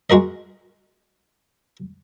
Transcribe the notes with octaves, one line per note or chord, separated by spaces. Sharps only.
G#3 F#4 A#4 D#5